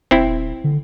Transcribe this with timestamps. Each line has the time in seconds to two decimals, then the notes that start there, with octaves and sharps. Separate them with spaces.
0.11 E1 C4 E4
0.28 D#1
0.64 D3